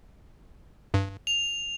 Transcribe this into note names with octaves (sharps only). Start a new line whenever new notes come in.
G2
F7